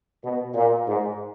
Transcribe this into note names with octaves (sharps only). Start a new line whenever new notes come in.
B2
A#2
G#2